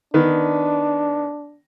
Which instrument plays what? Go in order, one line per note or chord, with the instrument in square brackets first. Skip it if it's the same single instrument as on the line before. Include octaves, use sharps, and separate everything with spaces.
[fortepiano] D#3 B3 [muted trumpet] D4